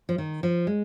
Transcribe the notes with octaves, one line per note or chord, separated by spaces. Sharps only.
F3
D#3
F3
G#3